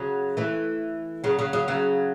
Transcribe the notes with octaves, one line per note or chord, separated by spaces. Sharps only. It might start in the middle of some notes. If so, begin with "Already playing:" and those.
Already playing: C#3 F#3
E3 A3
C#3 F#3
C#3 F#3
C#3 F#3
C#3 F#3